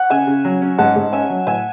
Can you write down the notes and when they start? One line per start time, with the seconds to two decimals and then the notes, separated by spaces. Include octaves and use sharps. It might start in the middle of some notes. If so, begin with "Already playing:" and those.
Already playing: C#5 F#5
0.10 C#3 E5 G#5
0.27 C#3
0.45 F#3
0.62 C#4
0.78 G#2 F#5 A5
0.96 G#2
1.13 C#4 E5 G#5
1.30 F#3
1.47 A2 E5 G#5